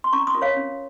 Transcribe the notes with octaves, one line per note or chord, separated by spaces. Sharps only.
C6
C#4 A#5 C#6
C6 D#6
F4 A#4
C#5 F5
C#4